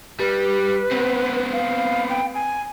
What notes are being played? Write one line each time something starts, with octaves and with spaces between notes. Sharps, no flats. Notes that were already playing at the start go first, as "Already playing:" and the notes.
G3 B4
B3 C4
F5
G5
G#5